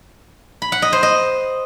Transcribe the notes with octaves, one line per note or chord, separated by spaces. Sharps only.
B5
F#5
D#5
C5
D#5